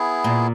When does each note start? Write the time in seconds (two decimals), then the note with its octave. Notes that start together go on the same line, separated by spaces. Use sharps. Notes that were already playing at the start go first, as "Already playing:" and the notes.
Already playing: B3 E4 G#4
0.24 A#2